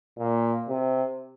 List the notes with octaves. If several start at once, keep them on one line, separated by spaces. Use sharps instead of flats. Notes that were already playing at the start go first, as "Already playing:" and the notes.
A#2
C3